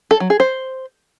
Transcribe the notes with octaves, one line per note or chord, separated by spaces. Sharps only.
A4
F#3
G#4
C5